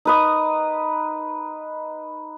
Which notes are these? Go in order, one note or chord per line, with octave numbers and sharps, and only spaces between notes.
D#4 B4 D#6